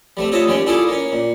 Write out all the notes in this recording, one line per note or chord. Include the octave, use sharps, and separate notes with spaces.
G3 A3 C4
F4 C#5 D#5 E5 A5
D#2 G3 C#4 G5
E4 F4 G#4 A4 D5 F5
A#3 C#4
A#2